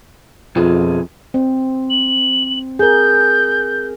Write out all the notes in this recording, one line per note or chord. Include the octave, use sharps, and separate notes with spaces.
F2 B2 F4 G#4
C4
F#7
G#4 A#4 G6